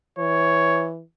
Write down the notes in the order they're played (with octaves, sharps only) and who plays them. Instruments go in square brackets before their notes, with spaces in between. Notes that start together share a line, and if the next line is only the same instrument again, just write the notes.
[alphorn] E3 [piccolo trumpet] C#5